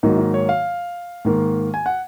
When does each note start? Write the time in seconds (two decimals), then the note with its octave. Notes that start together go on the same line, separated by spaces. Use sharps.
0.03 G#2 D#3 F#3 A#3 D#4
0.18 D#4
0.34 C#5
0.49 F5
1.25 G#2 D#3 A#3
1.74 G#5
1.86 F#5